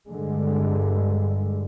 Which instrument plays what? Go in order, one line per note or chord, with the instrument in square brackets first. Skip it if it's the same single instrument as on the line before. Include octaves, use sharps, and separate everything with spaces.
[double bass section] G2 D3 G#3